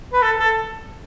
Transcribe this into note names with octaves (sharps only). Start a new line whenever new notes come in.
B4
A4
A4